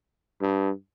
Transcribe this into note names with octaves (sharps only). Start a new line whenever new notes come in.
G2